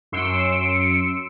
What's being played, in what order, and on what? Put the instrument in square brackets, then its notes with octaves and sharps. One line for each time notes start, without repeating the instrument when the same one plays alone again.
[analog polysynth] F#2 C6 E6 C#7 D7